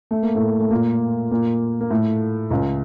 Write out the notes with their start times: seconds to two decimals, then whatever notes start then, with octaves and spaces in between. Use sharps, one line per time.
0.11 A3
0.23 A#3
0.35 A2 A3
0.60 A3
0.71 A#2 A#3
1.31 A#2 A#3
1.81 A#3
1.90 A2 A3
2.51 C#2 C#3